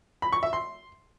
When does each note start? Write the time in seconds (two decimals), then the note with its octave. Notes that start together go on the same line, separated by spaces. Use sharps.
0.22 B5
0.33 C#6
0.43 E5
0.53 C6